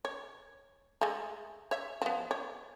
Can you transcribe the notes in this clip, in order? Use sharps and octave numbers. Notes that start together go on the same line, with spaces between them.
C#5
G#3 A3
C#5 E5
F3 B3
C#5